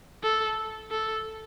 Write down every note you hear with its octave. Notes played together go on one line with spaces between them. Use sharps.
A4
A4